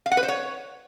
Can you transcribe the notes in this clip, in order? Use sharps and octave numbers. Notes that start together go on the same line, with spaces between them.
F5
F#5
B4
C5
C#5